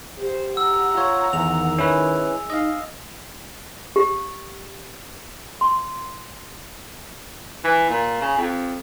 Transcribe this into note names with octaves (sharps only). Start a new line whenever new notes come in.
G4 C5
F#5 A#5 E6
F4 C#5
E2 D#3 F7
G#3 C#4 E4 B4
D#4 D#5 F5
G4
C6
E3
A#2
C#3
F2